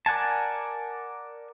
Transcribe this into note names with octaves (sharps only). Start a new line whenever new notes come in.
A#4 D5 F#5 G#5 A5